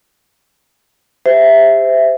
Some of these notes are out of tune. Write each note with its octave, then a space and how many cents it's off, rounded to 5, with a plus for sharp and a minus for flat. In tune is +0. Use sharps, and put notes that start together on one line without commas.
G4 +35 C5 -20 E5 +0